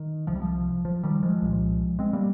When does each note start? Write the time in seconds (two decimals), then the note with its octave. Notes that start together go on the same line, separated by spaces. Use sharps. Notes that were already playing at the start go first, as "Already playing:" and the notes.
Already playing: D#3
0.27 C2 C3 F3
0.35 G3
0.42 F3
0.85 F3
1.03 D#3 G3
1.23 F3 G#3
1.42 C2 A#2
1.99 G#3 C4
2.13 G3 A#3